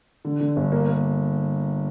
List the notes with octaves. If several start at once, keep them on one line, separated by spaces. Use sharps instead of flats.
D3
D3
G1
A#3
A#3